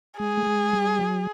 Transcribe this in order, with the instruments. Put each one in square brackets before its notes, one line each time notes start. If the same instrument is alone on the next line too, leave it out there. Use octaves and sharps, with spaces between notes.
[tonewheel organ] G#3 [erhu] G#4
[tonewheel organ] A3
G#3
G3
F#3